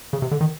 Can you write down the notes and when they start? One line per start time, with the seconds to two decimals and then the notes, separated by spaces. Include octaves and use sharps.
0.13 C#3
0.22 C3
0.31 D3
0.41 D#3